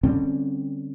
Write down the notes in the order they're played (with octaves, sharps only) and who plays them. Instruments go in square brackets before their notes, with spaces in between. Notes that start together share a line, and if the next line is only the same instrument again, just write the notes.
[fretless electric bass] D3 G3 C4 C#4